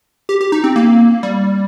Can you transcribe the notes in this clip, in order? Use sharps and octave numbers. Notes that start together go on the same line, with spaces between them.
G4
G4
D#4
C4
A#3
G3